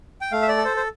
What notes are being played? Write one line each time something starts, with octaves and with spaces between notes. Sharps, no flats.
G5
A3 F5
E5
D5
A4
C5
C5